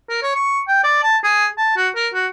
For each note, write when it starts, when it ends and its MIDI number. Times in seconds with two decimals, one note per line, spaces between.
0.09 0.19 70
0.23 0.31 73
0.36 0.60 85
0.68 0.83 79
0.84 1.01 74
1.03 1.17 81
1.24 1.47 68
1.58 1.74 81
1.77 1.89 66
1.96 2.09 70
2.14 2.27 66